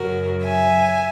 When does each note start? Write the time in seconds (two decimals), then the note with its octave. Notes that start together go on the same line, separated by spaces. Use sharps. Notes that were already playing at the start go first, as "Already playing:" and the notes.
Already playing: F#2 C#3 F#3 F#4 A#4
0.44 E5 G#5